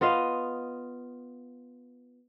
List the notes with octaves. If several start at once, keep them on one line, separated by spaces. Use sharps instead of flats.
B3 F4 D#5 F5